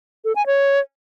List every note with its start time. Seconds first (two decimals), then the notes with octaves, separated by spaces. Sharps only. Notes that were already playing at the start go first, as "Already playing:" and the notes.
0.25 A4
0.36 G#5
0.46 C#5